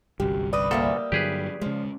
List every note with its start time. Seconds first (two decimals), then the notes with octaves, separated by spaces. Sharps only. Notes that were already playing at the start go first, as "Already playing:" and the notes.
0.20 G1 C2 F#2 G4
0.53 G3 B4 D5 D#6
0.71 D2 A#2 G3 A#3 A4 E5
1.12 G2 D3 F#3 G4 G#4 B4
1.61 C#3 F3 G#3